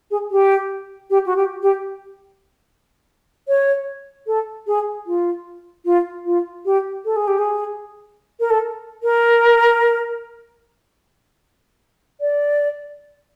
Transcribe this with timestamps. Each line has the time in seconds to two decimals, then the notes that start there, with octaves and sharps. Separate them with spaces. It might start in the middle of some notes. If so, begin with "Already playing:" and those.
0.11 G#4
0.31 G4
1.10 G4
1.26 F#4
1.36 G4
1.63 G4
3.48 C#5
4.27 A4
4.67 G#4
5.06 F4
5.85 F4
6.25 F4
6.65 G4
7.05 A4
7.16 G#4
7.28 G4
7.38 G#4
8.40 A#4
8.50 A4
9.03 A#4
12.21 D5